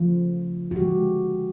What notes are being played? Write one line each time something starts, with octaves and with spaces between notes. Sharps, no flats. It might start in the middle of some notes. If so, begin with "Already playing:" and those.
Already playing: C#3 F3 A3 F4
F#4
D3 F3 G#3 G4